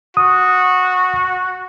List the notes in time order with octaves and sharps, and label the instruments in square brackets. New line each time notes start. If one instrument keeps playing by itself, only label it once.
[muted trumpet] F#4 [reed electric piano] D#6